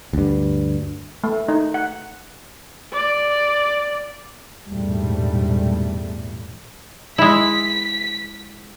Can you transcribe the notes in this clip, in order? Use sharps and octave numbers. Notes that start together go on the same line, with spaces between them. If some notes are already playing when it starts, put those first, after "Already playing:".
D2 G2
A3
D#4
F#5
D5
A#1 E2 G#2 B2 G3 A3
G#3 E4 B6